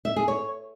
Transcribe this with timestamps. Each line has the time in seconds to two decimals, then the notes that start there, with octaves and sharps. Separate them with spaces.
0.05 E5
0.16 G#4
0.28 C#5